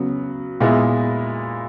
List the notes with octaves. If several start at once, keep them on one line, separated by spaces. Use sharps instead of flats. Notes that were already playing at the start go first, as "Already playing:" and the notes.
Already playing: C#3 F#3 B3
A#2 G#3 B3 E4